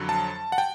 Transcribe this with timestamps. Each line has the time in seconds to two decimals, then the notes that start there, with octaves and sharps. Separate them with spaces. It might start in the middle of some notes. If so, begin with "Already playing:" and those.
Already playing: F2 D3 F#3
0.09 A5
0.52 F#5
0.58 G5